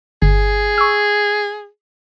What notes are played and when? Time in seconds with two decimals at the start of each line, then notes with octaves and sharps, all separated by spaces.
0.22 G1 G#4
0.78 C#6 E6